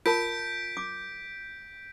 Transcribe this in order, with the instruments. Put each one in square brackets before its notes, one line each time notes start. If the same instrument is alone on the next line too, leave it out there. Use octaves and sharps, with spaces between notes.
[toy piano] F4 A#4 A5 [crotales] G6 B6 D7
[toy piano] D6